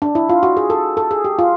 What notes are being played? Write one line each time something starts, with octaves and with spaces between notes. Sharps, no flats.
D4
E4
F4
F#4
G#4
A4
A4
G#4
G4
F4